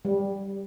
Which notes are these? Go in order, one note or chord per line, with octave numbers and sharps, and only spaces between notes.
G3